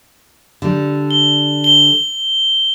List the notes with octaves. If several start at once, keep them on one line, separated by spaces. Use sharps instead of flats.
D3 G3
G7
G7